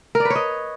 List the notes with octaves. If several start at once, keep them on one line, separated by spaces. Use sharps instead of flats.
A#4
D5
B4
C#5
D#5